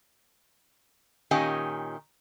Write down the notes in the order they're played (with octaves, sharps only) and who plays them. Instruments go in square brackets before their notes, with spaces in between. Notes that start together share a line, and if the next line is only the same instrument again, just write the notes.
[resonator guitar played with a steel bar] A#2 D#3 C#4 G4 D#5 G#5